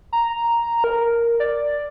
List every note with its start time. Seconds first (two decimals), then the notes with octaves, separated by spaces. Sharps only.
0.13 A#5
0.84 A#4
1.40 D5